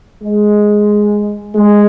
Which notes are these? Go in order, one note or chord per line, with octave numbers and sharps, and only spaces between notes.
G#3
G#3